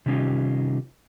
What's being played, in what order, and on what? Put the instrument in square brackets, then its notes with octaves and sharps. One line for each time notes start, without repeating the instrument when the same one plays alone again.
[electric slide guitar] C3 D#3 G3 C#4 D#4 F4